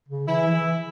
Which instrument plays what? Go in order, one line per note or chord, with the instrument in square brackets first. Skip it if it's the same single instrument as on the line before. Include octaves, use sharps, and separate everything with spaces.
[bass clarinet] C#3
[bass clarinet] E3 [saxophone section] E4
[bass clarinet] E3